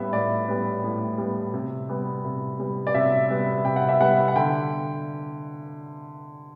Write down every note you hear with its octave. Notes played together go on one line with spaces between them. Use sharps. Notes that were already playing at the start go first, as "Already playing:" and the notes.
Already playing: A2 G3 B3 E5
A2 D5
G3 B3
A2
G3 B3
C3
G3 B3
C3
G3 B3
D5
C3 E5
G3 B3
C3 G5
F#5
E5
G3 B3 F#5
F#5
D3 G5